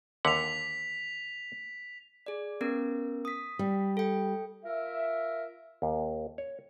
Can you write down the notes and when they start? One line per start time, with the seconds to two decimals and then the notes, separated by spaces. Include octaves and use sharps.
0.25 D#2 D3 F#5 B6 F7
2.26 G#4 D5
2.61 B3 C#4 A#4
3.25 D#6 B6
3.59 G3
3.97 A4 G5
4.65 F4 A#4 E5
5.82 D#2
6.38 C#5